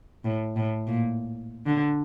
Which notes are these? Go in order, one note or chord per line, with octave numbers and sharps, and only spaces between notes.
A2
A2
A#2
D3